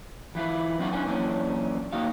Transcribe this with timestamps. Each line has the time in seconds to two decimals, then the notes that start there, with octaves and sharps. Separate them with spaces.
0.35 E3 E4 F4 B4
0.79 F#3 C4 D4 F4 F5 F#5
0.93 C#4 D4 B4 G#5
1.06 F#2 A#2 E3 C#4 D4
1.93 A#3 D#4 F#4 F5